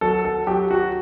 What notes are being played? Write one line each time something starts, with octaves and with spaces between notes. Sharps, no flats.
F#3 A4
A4
F#3 G4
F#4